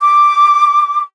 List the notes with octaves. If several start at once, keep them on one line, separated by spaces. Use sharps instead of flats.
D6